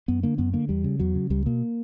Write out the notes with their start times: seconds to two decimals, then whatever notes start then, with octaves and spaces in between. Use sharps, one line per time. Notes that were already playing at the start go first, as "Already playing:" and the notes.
0.08 F#2 B3
0.23 D3 A#3
0.38 F#2 B3
0.54 D3 A#3
0.69 E2 G3
0.84 C#3
1.00 E2 F#3
1.15 C#3
1.30 C#2 G3
1.46 B2 A#3